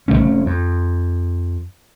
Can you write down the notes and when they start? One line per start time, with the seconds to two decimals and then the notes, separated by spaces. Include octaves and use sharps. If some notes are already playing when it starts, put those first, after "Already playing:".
0.08 F1 F2 A3 C#4
0.46 F2